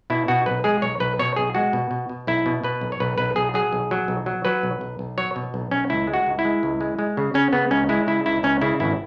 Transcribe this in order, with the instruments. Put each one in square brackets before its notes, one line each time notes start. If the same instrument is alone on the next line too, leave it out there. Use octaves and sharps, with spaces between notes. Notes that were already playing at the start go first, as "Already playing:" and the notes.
[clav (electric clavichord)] B2 E4
B2 F#4
B1 B4
G#3 G#4
B1 C#5
B1 B4
B2 C#5
B1 G#4
G#3 F#4
B2
B2
B2
B1 E4
B2
B2 B4
B1
C#5
B1 B4
B1 B4
B1 G#4
F#3 G#4
B1
F#3
B1
F#3
F#3 B4
B1
B1
B1
F#3 C#5
B2
B1
B1 C#4
C#2 E4
G#3
F#4
C#2
E4
G#3
C#2
G#3
G#3
C#3
C#3 C#4
C#3 B3
C#2 C#4
G#3 E4
C#3 E4
C#2 E4
C#2 C#4
C#3 E4
G#1 E4